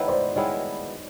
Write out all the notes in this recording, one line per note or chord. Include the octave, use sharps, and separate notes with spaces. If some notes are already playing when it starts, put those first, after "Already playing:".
Already playing: D#3 G#3 B3 E4 B4 C#5
C5 D5
D#3 G#3 B3 E4 C#5 D#5